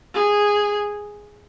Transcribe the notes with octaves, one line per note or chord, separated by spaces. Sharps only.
G#4